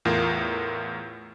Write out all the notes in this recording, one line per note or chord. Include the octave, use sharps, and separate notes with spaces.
E2 A2 F4 A#4